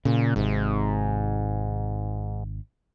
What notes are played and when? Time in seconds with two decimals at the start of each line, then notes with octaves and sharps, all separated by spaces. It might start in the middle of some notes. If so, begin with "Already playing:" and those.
0.05 A#2 C#3
0.36 G#1 G#2 C3